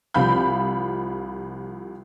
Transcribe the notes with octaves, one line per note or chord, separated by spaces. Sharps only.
C2 C3 F3 F5 B5 G6